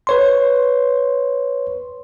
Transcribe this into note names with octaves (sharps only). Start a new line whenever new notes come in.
B4 C#5 C6